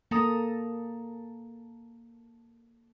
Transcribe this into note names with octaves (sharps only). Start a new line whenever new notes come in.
A#3 A4 A#5 D#6